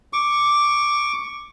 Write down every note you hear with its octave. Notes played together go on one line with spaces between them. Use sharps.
C#6 D6